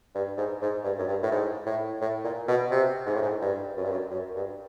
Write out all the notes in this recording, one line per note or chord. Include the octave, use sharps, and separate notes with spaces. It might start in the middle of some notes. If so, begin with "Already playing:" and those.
G2
G#2
G#2
G2
F#2
G2
A2
G#2
A2
A2
A#2
B2
C3
G#2
A2
G#2
G2
F#2
G2
F#2
F#2
G2